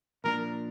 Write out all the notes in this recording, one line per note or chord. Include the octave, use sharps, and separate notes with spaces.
A#2 F3 A#3 D4 A#4